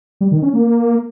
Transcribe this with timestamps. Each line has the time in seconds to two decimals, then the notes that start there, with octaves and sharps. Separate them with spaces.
0.21 G3
0.32 D#3
0.43 C#4
0.54 A#3